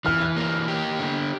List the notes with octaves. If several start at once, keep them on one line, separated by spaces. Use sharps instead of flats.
E3 F6
A#3
G4
D3